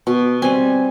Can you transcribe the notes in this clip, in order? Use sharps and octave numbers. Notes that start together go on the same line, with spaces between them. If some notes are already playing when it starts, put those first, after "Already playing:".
B2
G3 C4 G#5